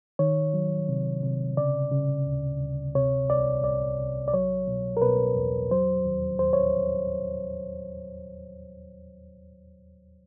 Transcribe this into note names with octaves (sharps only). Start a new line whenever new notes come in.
D#3 C#5
F#3
C3
C3
C#3 D5
C#3
D2
D2
C3 C#5
C2 D5
C2 D5
C2
D5
F#3 C#5
B2
A#4
B2 B4
E2
F#3 C5
D#2
D#2 C5
C#5